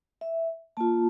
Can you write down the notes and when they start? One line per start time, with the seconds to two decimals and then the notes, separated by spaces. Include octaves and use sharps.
0.21 E5
0.77 A#3 F4 A5